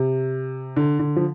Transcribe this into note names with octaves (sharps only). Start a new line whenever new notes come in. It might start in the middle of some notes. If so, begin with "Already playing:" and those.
Already playing: C3
D3
D3
F3